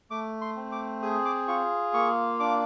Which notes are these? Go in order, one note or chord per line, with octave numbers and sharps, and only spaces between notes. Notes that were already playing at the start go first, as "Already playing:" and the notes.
A3 D6
C6
C4
D6
G#4 D#6
D6
F4 C#6
A#3 C#6
D4 D6